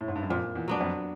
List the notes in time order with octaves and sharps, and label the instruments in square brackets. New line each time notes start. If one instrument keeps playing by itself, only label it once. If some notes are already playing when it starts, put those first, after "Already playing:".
[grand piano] A2
G#2
G2
F#2
[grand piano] F2 [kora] A#2
[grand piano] E2
[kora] F#3 B3 D4
[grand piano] F2